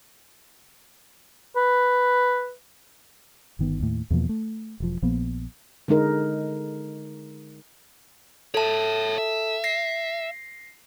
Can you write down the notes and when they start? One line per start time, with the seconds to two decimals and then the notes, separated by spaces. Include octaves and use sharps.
1.56 B4
3.59 G1 D#3 B3
3.80 D#2 A2
4.10 E2 B2 F3 A#3
4.29 A3
4.80 E1 F3
5.02 A#1 F3 A#3 B3
5.88 D3 G#3 D#4 A#4
8.55 A4 C#5 E5 A5
9.18 E5
9.64 A#6 C7